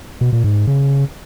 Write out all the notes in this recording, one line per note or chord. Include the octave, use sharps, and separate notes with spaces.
B2
A#2
G#2
G#2
C#3